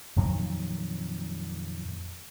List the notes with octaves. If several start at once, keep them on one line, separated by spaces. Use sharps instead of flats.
F2 A#2 D#3 F#3